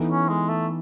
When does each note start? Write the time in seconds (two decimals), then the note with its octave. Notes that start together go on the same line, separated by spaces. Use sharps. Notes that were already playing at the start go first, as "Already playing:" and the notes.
Already playing: E3 B3 D#4 A4
0.09 C#4
0.29 G#3
0.49 A3